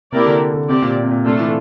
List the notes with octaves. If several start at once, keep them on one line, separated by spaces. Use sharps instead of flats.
C3 A#3 E4 G4 A#4 D5
D3
D3
C3 C4 G4 D5
A#2
C3
A#2
C3 A3 D4 F4 A4
E3